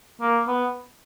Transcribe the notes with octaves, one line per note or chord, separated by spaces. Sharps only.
A#3
B3